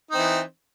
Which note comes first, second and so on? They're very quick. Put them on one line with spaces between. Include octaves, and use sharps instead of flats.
D#4 C4 E3